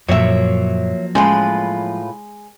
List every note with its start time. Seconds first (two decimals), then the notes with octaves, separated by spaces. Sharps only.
0.08 F#2 A#2 F3 F#3 A#3 C#5 E5
1.15 A2 G#3 C#4 F4 B4